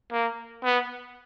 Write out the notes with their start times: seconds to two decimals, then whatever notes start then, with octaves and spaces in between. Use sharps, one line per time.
0.12 A#3
0.64 B3